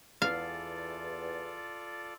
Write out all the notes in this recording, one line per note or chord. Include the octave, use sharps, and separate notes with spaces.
E2 F4 A4 D5 F5